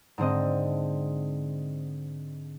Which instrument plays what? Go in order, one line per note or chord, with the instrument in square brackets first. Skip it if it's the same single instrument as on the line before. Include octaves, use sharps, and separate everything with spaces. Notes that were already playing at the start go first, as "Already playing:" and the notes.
[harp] G#2 D3 C4 D#5